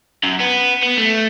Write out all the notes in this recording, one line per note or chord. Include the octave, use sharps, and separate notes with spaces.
F#2
B3
B3
A3